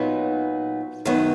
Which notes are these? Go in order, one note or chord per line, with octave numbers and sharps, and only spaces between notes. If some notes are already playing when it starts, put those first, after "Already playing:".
Already playing: A#2 F#3 B3 D#4
F#2 D#3 F#3 B3